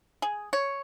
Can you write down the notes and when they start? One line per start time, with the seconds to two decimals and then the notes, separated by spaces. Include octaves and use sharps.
0.22 G#4
0.53 C#5